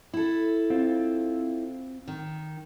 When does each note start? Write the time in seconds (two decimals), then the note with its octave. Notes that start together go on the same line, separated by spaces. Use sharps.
0.14 E4 A4
0.70 C4 F4
2.08 D#3